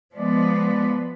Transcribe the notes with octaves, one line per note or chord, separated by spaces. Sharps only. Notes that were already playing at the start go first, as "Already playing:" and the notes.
F3 G#3 B3 D5